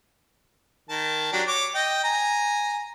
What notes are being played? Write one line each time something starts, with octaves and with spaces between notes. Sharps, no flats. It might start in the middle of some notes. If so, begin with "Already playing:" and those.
D#3 A5
F#3 D4 G4
C#5 D6
D#5 G5
G#5 A#5